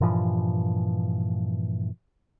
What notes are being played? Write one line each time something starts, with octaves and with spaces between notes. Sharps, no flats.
G2 A#2 E3 F3